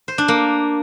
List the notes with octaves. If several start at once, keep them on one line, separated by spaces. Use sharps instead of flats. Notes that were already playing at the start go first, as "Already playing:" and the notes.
C5
D4
A#3